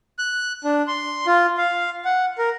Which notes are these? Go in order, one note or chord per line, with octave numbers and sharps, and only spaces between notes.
F#6
D4
C6
F4
F5
F#5
A#4